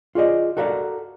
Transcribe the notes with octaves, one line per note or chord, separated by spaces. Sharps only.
F4 G#4 D5 D#5
F#4 A4 A#4 D5 F5